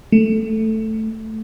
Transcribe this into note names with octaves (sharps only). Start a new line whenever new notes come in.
A3